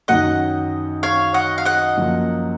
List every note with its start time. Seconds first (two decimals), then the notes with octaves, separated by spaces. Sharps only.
0.08 F#2 D#3 F#3 D#5 F#5
1.03 C#5 F5
1.34 D#5 F#5
1.58 F5
1.65 D#5 F#5
1.97 F#2 F3 A#3